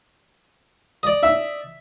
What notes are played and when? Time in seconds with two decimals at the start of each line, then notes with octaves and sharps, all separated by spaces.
1.03 D5 D#5
1.23 E5